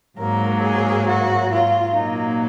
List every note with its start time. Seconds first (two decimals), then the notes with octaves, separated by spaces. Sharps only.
0.18 G#2 F#3 A#3 A#4
0.62 G#4
1.07 F#4
1.52 F4
1.94 A#2 F#3 A#3 D#4